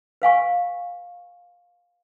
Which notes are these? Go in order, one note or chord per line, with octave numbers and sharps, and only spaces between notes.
B4 F5 G#5 C#6